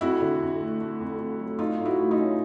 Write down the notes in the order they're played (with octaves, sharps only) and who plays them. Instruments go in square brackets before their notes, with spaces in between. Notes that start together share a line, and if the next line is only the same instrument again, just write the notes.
[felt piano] F2 E4 F#4
D3
F2
A3
A3
F2
F2
F#3
A3 D#4 F4
A2
E4 F#4
A3
D#4 F4
C#4